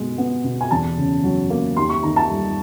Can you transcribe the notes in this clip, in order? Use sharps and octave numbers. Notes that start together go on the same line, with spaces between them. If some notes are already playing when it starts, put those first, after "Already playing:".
Already playing: B2 G#3
B3
B2
G#5
E2 A5
C#3
F#3
A#3
D#2 C6
C#6
D#3 A#5
A5
G3